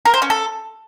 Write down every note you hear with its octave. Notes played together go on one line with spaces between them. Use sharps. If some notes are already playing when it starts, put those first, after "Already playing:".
A#4
C5
C#4
A4